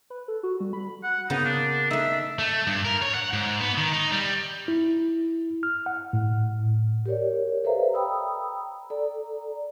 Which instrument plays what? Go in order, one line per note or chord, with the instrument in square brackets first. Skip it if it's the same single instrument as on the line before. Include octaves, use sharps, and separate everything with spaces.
[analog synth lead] B4
A4
F#4
G3
B5
[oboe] F#5
[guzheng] C#3 A#3 B3 [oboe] D#4
[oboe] D4
[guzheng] A3 D#4 [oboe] E5
[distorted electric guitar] A3
G2
A#4
C#5
F#5
G#2
B3
D#3
D#4
G3
[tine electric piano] E4
F6
F#5
A2
[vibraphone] G4 A#4 C#5 D5
A4 B4 C5 E5 F5 A#5
G5 A#5 B5 D#6 E6
A4 D5 A#5